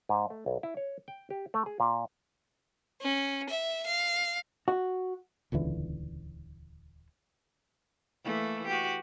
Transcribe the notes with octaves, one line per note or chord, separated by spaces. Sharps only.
G#2
A3
B1
E4
C#5
G5
G4
A3
G#4
A#2
C#4
E5
F5
F#4
D#1 C#2 D3 E3
E3 A3 A#3
F#4 G4